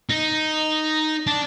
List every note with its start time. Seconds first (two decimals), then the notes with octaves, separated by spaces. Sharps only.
0.09 D#4
1.27 D4